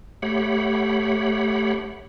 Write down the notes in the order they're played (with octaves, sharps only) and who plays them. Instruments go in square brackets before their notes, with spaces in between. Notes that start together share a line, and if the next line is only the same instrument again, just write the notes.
[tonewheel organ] A3 G4 C#5 F#5 B5